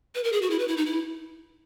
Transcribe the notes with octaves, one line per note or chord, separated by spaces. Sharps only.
B4
A#4
G#4
F#4
E4
B4
E4
D#4
E4